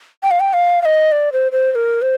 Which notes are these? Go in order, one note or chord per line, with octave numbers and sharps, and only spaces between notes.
G5
F5
G5
F5
F5
D#5
D5
C5
C5
C5
A#4
C5